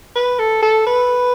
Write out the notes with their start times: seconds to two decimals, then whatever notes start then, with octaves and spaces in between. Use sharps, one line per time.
0.16 B4
0.39 A4
0.62 A4
0.87 B4